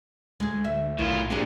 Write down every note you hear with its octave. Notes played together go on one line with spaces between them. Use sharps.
D2 G#3 G#4
E5
B1 A2 D#3 F4
A#2 D3 C4 G4 G#4